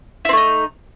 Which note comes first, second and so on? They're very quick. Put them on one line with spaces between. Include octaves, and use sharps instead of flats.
E4 C4 A3 D#4